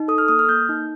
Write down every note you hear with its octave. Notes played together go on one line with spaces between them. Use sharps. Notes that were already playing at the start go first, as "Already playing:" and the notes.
Already playing: D#4
A4 D#6
F6
A#3 D#6
F6
A#3 G6
D#4